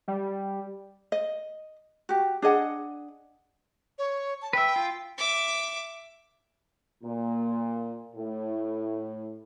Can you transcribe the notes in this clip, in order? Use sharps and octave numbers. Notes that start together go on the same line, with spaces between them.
G3
D#5
F#4 G4
D4 G#4 D#5 F#5
C#5
A5
B4 E5 G5
F4
E5 D6
A#2
A2